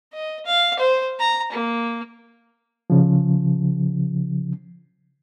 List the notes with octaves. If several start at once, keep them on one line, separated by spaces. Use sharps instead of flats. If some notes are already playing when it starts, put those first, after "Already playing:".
D#5
F5
C5
A#5
A#3
C#3 F3